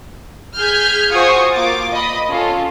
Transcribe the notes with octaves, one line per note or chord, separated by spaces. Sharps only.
G#4 F6 G6 G#6 B6
F4 F#4 C5 G#5 C#6 D#6
A#3 F4 D6 A6
D#5 B5
C#4 F4 A4